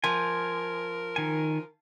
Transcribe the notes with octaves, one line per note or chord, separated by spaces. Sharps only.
F3 A#4 G#5
D#3 G#5